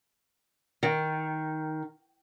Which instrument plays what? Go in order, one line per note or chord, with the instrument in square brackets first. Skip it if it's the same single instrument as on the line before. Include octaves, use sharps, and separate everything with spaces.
[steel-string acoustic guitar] D#3